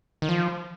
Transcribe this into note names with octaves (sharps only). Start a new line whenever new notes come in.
D#3
F3